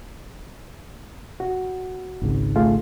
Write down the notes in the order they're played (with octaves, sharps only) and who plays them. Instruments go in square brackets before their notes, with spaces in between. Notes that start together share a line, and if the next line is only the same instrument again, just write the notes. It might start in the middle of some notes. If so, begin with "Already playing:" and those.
[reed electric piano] F#4
[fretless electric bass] G#1 C#2
[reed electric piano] A3 F4 G#4